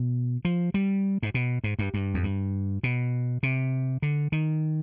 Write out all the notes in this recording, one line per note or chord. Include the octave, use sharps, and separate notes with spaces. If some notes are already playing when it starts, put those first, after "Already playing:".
Already playing: B2
F3
G3
G#2
B2
G#2
G2
G2
F2
G2
B2
C3
D3
D#3